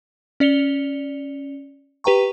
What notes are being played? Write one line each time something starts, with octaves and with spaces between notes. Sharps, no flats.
C#4 D5 C#7 F7 G7
G4 B4 G5 A#5 C#6